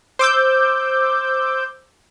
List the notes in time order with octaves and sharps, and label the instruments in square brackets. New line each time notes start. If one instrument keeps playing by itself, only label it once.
[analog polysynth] C5 D6 E6 G6